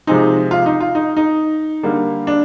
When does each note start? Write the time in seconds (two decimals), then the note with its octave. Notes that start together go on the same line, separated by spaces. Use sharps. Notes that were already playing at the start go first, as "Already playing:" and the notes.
0.07 C3 F3 G#3 C4 D#4
0.51 F4
0.66 D#4
0.80 F4
0.95 D#4
1.17 D#4
1.83 D3 G3 A#3
2.27 D4